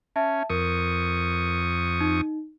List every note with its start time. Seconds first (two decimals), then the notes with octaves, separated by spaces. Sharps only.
0.16 C#4 E5 A5
0.50 F2 A#4 C#6 D#6
2.00 D#4